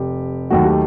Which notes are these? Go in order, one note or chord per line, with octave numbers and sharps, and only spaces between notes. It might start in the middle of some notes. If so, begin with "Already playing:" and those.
Already playing: F1 G4
D#2 D#3 F#3 A3 F#4
G4